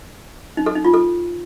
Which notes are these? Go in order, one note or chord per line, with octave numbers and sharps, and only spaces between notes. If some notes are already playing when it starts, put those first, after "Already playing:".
D#4
A4
D#4
F4
A4